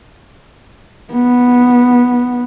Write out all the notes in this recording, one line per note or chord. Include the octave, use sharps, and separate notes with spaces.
B3